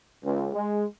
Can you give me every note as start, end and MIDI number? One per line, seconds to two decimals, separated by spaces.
0.24 0.51 37
0.53 0.83 56